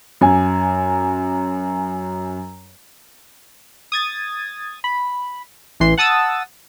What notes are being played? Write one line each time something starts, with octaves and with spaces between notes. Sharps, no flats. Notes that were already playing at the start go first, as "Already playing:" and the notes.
F#2 G#5
D#6 G#6 A6
B5
A1 E3 C6
F#5 A5 D#6 E6 A6